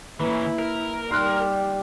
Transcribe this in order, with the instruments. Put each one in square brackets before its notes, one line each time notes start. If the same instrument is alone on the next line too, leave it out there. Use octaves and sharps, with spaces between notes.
[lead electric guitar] E3 C#4 [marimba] A#3 B4 [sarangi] E4
[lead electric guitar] A#4
[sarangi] G3 [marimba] D#4 [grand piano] C6 F6 F#6